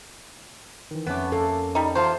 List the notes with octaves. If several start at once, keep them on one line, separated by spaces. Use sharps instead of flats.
D#3 E3
F2 A3 B3 C#4 D6
A#3 A4
G3 D#4
E2 F4 C5 A5